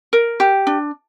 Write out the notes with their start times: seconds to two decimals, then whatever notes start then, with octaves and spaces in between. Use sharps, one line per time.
0.13 A#4
0.40 G4
0.67 D4